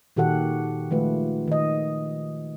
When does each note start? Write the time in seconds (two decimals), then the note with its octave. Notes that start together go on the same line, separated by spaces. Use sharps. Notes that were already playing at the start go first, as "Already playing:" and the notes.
0.17 A#2 D#3 F#4 G4 A4 F#5
0.91 D#3 F3 G#3 A3 F4 B4
1.48 D#3 D#5